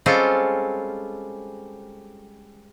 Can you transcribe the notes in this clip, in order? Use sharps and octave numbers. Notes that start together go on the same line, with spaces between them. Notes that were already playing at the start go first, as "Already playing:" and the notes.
G3 G#3 C4 C#4 F4 A4